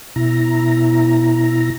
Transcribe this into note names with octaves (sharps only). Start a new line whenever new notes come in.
B2 E4 A#5